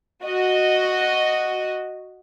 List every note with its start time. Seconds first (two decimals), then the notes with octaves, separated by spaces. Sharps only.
0.25 F#4 D#5